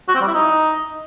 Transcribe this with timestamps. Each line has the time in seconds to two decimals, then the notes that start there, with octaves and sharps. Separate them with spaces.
0.08 F#4
0.15 C4
0.21 G3
0.28 E4
0.34 D#4